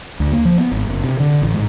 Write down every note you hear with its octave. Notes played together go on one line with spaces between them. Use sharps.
D2
A#3
F3
B3
G#1
F#1
C3
D3
A1
G#2